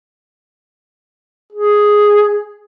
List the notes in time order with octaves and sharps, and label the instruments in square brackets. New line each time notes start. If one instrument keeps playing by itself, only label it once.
[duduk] G#4